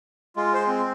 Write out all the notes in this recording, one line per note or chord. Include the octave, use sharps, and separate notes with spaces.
G#3 F4
C5
C4